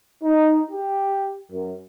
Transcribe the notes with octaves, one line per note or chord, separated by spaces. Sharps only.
D#4
G4
F#2